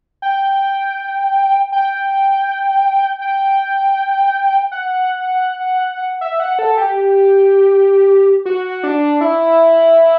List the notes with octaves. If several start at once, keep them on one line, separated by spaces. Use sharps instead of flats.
G5
G5
G5
F#5
E5
F#5
A4
G4
F#4
D4
E4